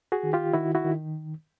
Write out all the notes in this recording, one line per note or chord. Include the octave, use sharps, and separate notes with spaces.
F#4 G#4
D#3
F4 G4
D#3 E4 F#4
E4 F#4
D#3